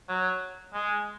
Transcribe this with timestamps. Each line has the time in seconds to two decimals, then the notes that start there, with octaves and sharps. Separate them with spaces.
0.09 F#3
0.74 G#3